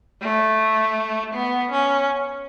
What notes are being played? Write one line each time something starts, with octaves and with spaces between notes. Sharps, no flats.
A3
B3
C#4